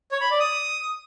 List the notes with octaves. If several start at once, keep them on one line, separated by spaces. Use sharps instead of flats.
C#5
B5
D5
D#6